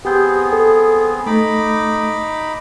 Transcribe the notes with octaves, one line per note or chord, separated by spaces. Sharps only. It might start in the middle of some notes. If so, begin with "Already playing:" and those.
B3 C4 G4 G#4 G6
A4
A3 D#4 B5 D6